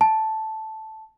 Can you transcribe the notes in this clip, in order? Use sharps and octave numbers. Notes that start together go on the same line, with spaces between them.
A5